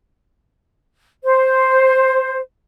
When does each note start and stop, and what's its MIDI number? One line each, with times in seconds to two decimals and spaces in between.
1.23 2.38 72